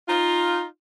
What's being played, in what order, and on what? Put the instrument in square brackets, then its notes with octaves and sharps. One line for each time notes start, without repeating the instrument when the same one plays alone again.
[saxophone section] D#4 F4